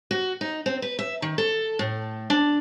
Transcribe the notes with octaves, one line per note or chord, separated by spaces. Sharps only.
F#4
D#4
C4
B4
E5
D#3
A4
A2
D4